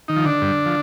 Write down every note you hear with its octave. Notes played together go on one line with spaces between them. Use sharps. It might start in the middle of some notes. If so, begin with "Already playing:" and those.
D#3 D#4
F3
D3 D4
G2
F3